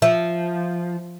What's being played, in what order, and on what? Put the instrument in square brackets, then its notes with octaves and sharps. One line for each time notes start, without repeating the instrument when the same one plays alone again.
[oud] F3 [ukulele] E5